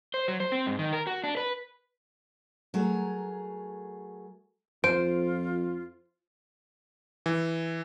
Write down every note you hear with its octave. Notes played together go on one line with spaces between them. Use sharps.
C5
F#3
C5
C4
G#2
D#3
A#4
F#4
D4
B4
F#3 A3 G#4 A#4
F2 F4 C5 D7
E3